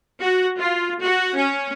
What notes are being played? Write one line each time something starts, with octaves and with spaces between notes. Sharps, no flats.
F#4
F4
F#4
C#4